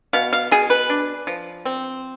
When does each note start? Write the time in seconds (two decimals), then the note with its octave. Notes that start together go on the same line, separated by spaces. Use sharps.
0.13 B2 F5
0.33 F5
0.51 B2 G#4
0.70 B4
0.90 D4
1.27 F3
1.65 C4